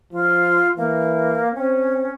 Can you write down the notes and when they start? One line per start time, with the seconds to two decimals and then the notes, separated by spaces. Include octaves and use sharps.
0.12 F3 F4
0.77 E3 A#3
1.55 C4 C#4